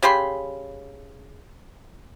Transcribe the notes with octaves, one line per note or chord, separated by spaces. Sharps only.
C#3 G4 B5 C6